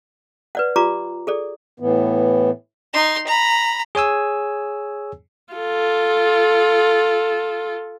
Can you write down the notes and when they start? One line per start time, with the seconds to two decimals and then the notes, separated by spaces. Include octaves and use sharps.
0.55 B4 D5 F#5
0.76 F4 G4 D5 A#5 D6
1.27 G#4 A4 D5
1.80 A2 E3 B3
2.93 D#4 C6
3.27 A#5 B5
3.95 G#4 C#5 G#5 E6
5.54 F4 A4